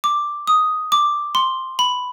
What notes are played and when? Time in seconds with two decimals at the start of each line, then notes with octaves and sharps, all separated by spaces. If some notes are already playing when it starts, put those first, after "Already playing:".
0.04 D6
0.47 D#6
0.92 D6
1.35 C6
1.79 B5